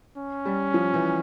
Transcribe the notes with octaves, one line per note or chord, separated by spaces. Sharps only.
C#4
G3
F3
E3